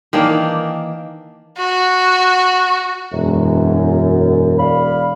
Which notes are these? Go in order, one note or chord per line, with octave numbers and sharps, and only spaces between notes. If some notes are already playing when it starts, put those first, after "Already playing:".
D#3 E3 A#3 D4
F#4
E1 F#2
D5 F5 B5